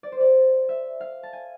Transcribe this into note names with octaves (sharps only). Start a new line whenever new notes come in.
D5
C5
D5
E5
F5
A5
G#5